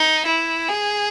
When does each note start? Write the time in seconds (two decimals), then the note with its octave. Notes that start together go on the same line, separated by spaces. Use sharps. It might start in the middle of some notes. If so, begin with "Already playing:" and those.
Already playing: D#4
0.26 E4
0.69 G#4